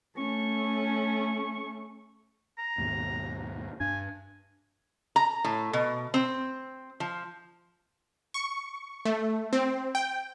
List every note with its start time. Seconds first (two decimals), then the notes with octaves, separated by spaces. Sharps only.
0.17 A3 C#4 C#6
2.58 A#5
2.78 D#2 G#2 B2
3.80 G2 D4 G#5
5.16 A#5
5.44 A2
5.73 B2
6.14 C4
7.00 F3
8.34 C#6
9.05 A3
9.53 C4
9.95 G5